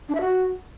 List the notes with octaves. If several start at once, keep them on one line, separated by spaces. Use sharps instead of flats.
D4
E5
F#4